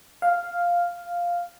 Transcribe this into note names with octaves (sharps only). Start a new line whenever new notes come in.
F5